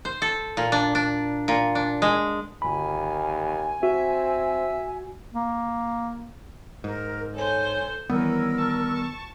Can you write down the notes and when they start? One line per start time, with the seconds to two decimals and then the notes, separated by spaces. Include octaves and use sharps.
0.05 C5
0.22 A4
0.57 A#2
0.72 D4
0.95 D4
1.48 A#2
1.75 D4
2.02 G#3
2.62 G1 D#2 G#5 B5
3.83 C4 F#4 E5
5.33 A#3
6.84 G#2 A#4
7.34 A4 C5 C#5 G#5
8.10 D#3 E3 G3 B3 C#4 A#4 E6
8.58 A5 C#6